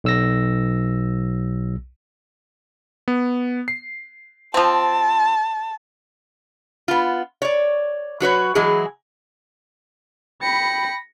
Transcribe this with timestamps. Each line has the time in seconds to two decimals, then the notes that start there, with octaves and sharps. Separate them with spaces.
0.04 B1 E6 A#6
3.08 B3
3.68 C7
4.54 F3 C4 A5
6.88 B3 F4
7.42 C#5 D5
8.20 F#3 F#4 B4 C#5
8.55 E3 F#3 G#3 E4 G#4
10.42 G5 B5 A#6 C#7